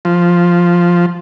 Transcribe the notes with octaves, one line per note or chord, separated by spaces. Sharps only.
F3